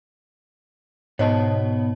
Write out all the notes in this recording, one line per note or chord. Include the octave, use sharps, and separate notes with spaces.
G#2 B2 B3 C#5 D#5 A5